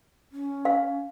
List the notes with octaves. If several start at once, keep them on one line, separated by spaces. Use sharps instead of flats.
C#4
F5